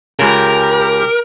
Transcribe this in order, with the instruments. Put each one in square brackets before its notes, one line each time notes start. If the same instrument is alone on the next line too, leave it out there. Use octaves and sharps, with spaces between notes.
[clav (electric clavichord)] C#2 C#3 [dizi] G4 [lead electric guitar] A#4